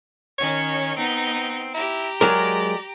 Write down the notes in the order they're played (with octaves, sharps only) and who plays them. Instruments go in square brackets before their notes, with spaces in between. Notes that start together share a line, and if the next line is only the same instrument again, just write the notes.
[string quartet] D#3 C#4 [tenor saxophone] C#5
[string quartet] B3 D#4 [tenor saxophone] C4
[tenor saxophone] E4 [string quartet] G4 A#5
[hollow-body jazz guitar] F#3 G#3 A#4 [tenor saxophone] D5